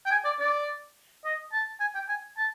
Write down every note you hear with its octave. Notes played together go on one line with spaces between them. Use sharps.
G5
G#5
D5
D5
D#5
A5
G#5
G5
G#5
A5